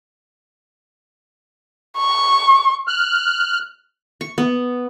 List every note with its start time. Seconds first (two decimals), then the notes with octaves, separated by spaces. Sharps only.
1.97 C#6
2.88 F6 F#6
4.21 C#6
4.38 B3